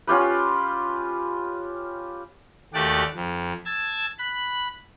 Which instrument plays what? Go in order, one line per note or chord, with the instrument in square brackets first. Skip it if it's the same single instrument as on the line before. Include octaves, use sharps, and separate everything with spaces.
[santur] C#4 F4 G4 B4
[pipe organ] D#2 A3 F#4 G4 D5 A6
F2
A5 E6 G#6
B5 F#6